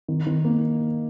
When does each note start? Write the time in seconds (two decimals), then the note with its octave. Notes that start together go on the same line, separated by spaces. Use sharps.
0.08 D#3
0.27 D#3
0.45 A#3